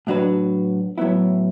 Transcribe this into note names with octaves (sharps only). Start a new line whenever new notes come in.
A2 F#3 D4 F#4 B4
A2 F#3 B3 E4